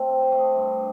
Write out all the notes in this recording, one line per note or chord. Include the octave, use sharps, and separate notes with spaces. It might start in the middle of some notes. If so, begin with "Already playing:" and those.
Already playing: A3 C4 A4
C3
C5
A3
D#5
G2